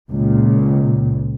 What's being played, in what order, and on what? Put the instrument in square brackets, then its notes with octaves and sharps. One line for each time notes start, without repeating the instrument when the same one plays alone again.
[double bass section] C#2 A#2